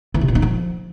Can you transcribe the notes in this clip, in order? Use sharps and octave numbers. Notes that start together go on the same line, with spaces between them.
E3
C3
A#2
D#4
F3